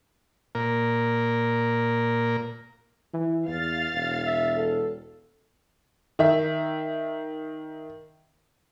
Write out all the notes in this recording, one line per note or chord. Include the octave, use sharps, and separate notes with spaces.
A#2 A#4
E3
E2 F5 A6
E1
E5
A4
D#3 E5